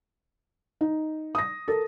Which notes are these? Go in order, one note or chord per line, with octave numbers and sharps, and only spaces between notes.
D#4
D#6 A#6
A4 A#4